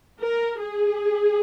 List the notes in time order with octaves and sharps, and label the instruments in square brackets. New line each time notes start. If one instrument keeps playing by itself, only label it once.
[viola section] A#4
G#4